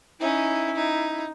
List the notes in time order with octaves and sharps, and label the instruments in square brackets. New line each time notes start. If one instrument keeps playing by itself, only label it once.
[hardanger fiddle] C#4 D#4 [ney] E4
[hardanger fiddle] D#4